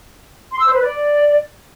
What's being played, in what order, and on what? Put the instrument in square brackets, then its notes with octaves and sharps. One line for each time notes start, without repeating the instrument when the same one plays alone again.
[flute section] C6
E6
C5
B4
D5